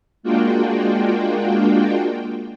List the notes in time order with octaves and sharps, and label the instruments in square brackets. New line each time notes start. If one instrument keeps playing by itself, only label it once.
[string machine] G#3 A#3 D4 F4 F#4 G5